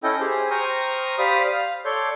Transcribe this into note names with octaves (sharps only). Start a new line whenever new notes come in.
C#4 E4 A4 D#5 G5
G4 G#4 C5
C5 G5 A#5 C#6 D#6 F6
G4 C5 D5 F5 B5 D#6
F5
A4 C#5 D5 C6 G6